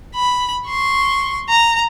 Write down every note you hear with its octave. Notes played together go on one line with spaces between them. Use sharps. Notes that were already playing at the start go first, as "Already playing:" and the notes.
B5
C6 C#6
A#5